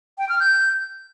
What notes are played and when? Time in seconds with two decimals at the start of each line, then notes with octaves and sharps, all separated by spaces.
0.18 G5
0.29 F6
0.40 G6